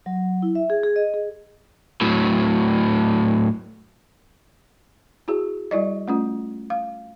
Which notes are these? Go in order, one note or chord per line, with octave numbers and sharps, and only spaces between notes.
F#3
E4
E5
G#4
G#4
D#5
G#4
A2 F#3
E4 F#4 G#4
G3 E4 D5 D#5
A3 C#4 F4
F5